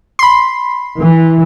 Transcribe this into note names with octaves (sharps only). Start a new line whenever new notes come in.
B5 C6
E3